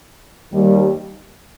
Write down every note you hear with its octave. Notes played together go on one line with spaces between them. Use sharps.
D#2 D#3 G3